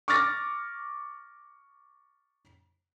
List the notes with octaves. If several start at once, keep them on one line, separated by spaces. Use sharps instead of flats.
C#6 D6 F6 A6 A#6